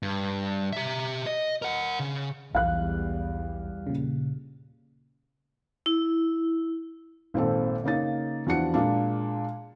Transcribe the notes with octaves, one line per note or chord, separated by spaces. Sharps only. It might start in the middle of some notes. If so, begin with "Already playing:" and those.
G2
G4 E5
D#5
A#4 F#5
C#3
B1 E2 G3 F5 F#6
A#2 C#3
E4
G#1 A#2 C4 A4
C#3 A#3 D#4 A6
E2 F3 D4 F#4 F#5 C#7
A#2 G#3 A#3 D4